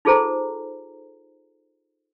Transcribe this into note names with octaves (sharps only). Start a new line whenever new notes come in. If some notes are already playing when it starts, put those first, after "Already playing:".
D#4 F4 G#4 A4 C5 A#5